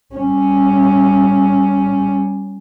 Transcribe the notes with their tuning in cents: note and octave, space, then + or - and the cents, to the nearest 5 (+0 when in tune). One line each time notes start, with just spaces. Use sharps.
G3 +0 C#4 +0